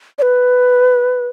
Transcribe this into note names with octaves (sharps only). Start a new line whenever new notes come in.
D5
B4